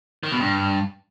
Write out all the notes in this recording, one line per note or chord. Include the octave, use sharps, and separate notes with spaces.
D#3
B2
G2